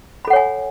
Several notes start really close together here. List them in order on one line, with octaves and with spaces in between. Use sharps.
B5 A4 F#5 C#5 G#5